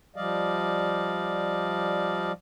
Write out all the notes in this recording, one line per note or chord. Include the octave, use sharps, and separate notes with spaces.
F3 G3 D5 D#5 F5